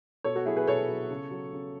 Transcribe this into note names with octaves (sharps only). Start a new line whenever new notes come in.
B2 A4 C#5
F#4 A4
F#3 E4 G#4
G#4 B4
B2 A4 C#5
F#3
C#3
F#3
C#3